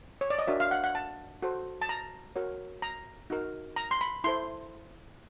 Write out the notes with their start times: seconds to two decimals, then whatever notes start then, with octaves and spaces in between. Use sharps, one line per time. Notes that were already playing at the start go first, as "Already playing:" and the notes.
0.21 C#5
0.30 D5
0.39 D#5
0.47 D4 F#4 A#4 C#5 E5
0.60 F5
0.71 F#5
0.84 F#5
0.95 A5
1.42 F#4 A4 C5
1.82 A5
1.89 A#5
2.36 F#4 A#4 C#5
2.82 A#5
3.30 D#4 F#4 A#4
3.76 A#5
3.91 C6
4.01 B5
4.24 E4 A4 C5 C6